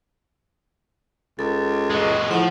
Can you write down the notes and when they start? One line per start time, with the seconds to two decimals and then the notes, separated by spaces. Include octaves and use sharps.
1.39 C#2 A4
1.90 G#3 F#4
2.31 A2 F3 F#5